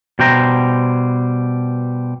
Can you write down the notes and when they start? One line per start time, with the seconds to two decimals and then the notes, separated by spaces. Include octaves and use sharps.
0.19 B2 G3 C5 G5 A#5